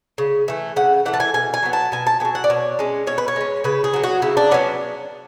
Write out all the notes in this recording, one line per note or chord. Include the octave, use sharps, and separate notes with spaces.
C#3
E3 A3
C#3 F#5
E3 A3 F#5
A5
G#5
B2 G#5
G#5
F#3 B3
A5
B2 G#5
A5
F#3 B3 G#5
F#5
D5
B2 C#5
G#3 C#4
B2 C#5
B4
C#5
G#3 C#4
C#3 B4
G#4
F#3 B3
F#4
C#3 E4
D4
F#3 B3 C#4